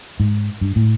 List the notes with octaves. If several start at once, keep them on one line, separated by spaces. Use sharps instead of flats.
G#2
G2
A2